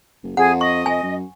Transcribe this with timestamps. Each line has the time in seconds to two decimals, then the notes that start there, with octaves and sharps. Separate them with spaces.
0.24 F#1
0.37 F2 G#4 F#5
0.61 D#5 C#6
0.86 F2 G#5
1.03 F#2